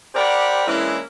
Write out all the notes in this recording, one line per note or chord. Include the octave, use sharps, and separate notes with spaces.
C4 G4 A#4 D5 F#5 B5
E3 G#3 A#3 C#4 D4 E4